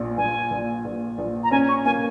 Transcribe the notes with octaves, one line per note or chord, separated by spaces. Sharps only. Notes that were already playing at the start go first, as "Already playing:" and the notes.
Already playing: A#1 A#2
A#1 G#5
A#1
A#1
A#1
A#5
C#4 G#5
C#6
A#3 G#5